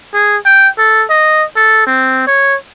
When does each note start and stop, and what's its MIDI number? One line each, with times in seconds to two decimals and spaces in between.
0.14 0.37 68
0.46 0.68 79
0.78 1.04 69
1.10 1.44 75
1.56 1.82 69
1.87 2.23 60
2.27 2.55 73